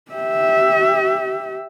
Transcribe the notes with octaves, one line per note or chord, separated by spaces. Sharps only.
G4 E5